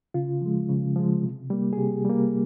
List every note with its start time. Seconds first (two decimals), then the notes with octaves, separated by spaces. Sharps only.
0.14 C#3 F4
0.42 F3 G#3
0.69 C#3
0.96 F3 G#3
1.23 C3
1.50 G3 A#3
1.73 G#4
1.77 C3 G4
2.05 G3 A#3